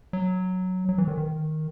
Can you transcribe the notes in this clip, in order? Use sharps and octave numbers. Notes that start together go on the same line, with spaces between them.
F#3
F#3
E3
D#3
D#3